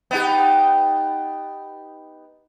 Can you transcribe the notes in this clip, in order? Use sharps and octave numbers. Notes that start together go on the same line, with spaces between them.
B3 D#4 G4